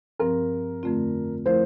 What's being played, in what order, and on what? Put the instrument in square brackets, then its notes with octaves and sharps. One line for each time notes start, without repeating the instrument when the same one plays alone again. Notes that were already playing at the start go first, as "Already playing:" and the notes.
[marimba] G2 F3 C4 [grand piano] A#4
[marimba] F2 D3 A3 C4 F4
[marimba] F3 A3 E4 A#4 [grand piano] C5